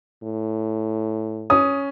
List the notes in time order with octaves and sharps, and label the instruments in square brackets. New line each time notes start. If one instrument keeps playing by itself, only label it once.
[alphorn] A2
[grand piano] C#4 [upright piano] D#6